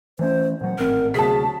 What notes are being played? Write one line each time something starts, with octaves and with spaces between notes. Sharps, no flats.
E3 A3 C#4 C5
A#2 F#3 F#5
G#1 A2 C4 A#4
D2 C3 F#3 G#4 A5 B6